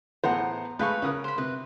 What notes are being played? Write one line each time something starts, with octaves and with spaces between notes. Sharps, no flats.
A2 E3 B3 G#4 C5 F#5 A#5
G#3 A3 B4 F5 B5 C#6 G6
C#3 A#4 D#6 F#6
C5 B5
C3 B4